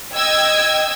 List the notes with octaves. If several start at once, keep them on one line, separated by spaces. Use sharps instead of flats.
D#5 G5 E6 G#6